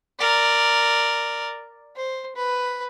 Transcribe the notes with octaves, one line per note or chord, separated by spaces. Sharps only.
A#4 D5
C5
B4